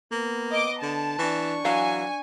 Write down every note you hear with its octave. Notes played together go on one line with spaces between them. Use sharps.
A#3 B3
D#5 D6
D3 A5
E3 D4 C#6
E3 F#3 F5 G#5